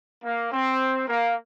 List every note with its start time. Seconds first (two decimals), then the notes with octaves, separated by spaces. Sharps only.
0.24 A#3
0.52 C4
1.09 A#3